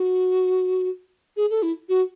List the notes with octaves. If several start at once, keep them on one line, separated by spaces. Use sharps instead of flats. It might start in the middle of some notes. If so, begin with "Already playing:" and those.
Already playing: F#4
G#4
A4
E4
F#4